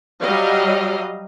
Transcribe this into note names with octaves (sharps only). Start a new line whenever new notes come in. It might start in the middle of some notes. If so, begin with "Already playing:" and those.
F#3 G3 D#5 F5